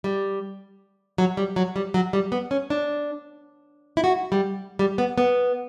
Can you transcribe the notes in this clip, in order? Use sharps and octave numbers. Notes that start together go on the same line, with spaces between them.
G3
F#3
G3
F#3
G3
F#3
G3
B3
C#4
D4
E4
F#4
G3
G3
B3
B3